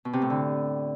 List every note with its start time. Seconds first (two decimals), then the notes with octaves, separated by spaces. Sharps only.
0.05 B2
0.13 C3
0.22 A2
0.30 D3